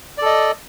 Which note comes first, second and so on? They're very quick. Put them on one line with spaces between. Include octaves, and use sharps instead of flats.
D5 A4 D#5